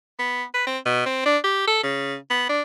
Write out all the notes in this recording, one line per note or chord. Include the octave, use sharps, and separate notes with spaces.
B3
B4
C4
B2
C4
D4
G4
A4
C#3
B3
D4